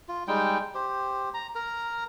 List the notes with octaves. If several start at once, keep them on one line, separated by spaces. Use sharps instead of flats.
F4
G3 G#3 D#4 G5
G4 C5
A#5
A#4 A#5